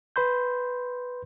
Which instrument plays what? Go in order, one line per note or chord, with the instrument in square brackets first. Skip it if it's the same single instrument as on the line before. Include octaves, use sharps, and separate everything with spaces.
[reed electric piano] B4 B5 C6 G6